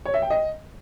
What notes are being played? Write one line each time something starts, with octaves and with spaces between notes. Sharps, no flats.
C#5
E5
G5
D#5